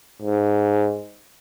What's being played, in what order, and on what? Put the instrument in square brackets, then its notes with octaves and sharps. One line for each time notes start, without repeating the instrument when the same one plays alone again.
[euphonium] G#2